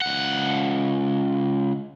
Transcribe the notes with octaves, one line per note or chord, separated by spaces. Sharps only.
C#2 F#5